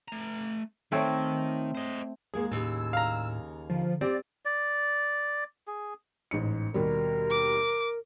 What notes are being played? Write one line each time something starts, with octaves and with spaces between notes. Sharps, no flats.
A3 A#5
D#3 A3 C4 C#5
C5 D#5
D#2 G#3 A#3 G#4
D#2 A2 C#3 E6
F5 A#5
D3 F3
C4 G4 D5
D5
G#4
A1 G#2 C#7
D#2 B2 G3 A#4
D6